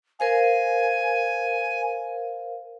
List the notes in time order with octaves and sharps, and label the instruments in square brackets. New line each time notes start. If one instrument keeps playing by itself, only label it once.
[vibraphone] A#4 C5 F5 [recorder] G#5